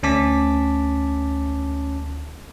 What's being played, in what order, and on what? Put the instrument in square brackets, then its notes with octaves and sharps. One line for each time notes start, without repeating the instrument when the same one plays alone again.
[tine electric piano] D2 C#4 A5 D6 B6